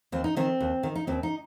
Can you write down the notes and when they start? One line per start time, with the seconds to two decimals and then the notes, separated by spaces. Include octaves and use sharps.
0.12 D#2 C4
0.24 D#4
0.37 D#3 C4
0.61 D#2
0.83 D#3
0.95 D#4
1.07 D#2 C4
1.23 D#4